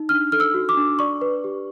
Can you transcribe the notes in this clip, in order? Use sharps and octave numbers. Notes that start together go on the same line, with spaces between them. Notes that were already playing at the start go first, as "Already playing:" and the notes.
Already playing: D#4
D4 F6
A4 F6
E6
F#4
D6
D4
D5 C#6
B4
G4